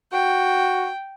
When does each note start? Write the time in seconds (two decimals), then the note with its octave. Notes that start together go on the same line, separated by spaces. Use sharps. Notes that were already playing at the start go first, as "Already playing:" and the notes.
0.13 F#4 G5